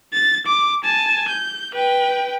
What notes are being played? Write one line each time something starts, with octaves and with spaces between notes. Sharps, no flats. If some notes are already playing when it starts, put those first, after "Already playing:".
A6
D6
G#5 A5
G6
B4 G5